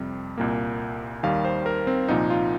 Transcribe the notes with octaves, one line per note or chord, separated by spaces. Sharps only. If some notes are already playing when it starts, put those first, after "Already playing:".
Already playing: F2 C3 G3
C2 A#2 A#3
D#2 D#3 G3 F5
C5
A#4
C4
C2 A#2 F3 A#3 D#4
F4